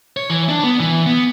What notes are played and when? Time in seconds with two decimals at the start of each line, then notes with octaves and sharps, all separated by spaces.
0.17 C#5
0.30 E3
0.49 D4
0.64 B3
0.80 E3
1.06 B3